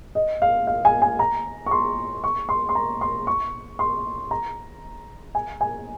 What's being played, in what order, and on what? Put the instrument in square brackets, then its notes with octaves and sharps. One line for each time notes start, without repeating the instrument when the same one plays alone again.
[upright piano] D#5
F5
F5
G#5
G#5
A#5
C#6
C6
C#6
C6
C6
A#5
C6
C#6
C6
A#5
G#5
G#5